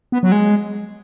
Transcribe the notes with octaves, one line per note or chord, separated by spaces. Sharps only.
B3
F#3
G#3